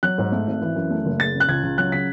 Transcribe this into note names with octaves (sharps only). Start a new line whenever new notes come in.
F#3 F#6
G#2
A3
G#1
E3
F#2
A3
F#1
G#3 A6
C#3
F#6
C#2 G#6
C#2
F#3 F#6
C#3 B6